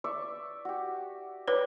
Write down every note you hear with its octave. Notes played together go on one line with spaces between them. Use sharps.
D5 E5 C#6
F#4 G4
B4 C#5 D5 G5 B5